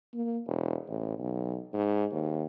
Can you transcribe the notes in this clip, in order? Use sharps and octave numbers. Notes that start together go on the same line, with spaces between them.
A#3
E1
A1
B1
G#2
D#2